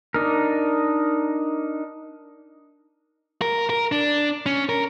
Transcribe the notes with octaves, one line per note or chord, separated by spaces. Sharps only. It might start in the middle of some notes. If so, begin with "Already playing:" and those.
D4 D#4 A#4
A#4
A#4
D4
C#4
A#4